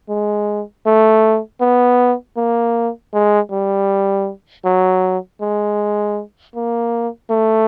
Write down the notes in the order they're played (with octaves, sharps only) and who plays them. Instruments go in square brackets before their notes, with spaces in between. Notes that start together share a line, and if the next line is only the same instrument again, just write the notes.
[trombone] G#3
A3
B3
A#3
G#3
G3
F#3
G#3
A#3
A3